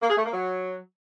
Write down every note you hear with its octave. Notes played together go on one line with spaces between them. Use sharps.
A#3
G#4
A3
A#3
F#3